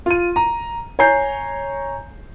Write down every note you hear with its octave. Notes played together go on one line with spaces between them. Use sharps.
F4 D#7
A#5
C#5 G#5 A#5 G6 C7